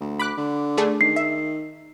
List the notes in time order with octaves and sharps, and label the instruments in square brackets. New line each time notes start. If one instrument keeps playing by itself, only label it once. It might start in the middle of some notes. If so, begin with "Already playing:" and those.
[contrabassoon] D2
[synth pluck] B5 D6 F#6
[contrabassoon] D3
[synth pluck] A3 D4 G#4
[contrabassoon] D#3 [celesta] C7
[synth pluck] E5